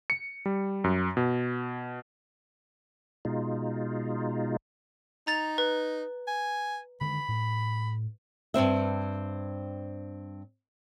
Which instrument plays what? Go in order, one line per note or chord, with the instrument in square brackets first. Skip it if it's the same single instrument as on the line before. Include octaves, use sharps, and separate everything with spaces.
[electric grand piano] C#7
G3
F#2
B2
[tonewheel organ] B2 G#3 D#4 F4
[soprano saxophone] D#4 [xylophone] A#5 A6 F7
[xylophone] B4
[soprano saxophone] G#5
[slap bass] D3 D#3 G#3 [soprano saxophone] B5
[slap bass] A2
[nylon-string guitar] G2 D#3 C4 E5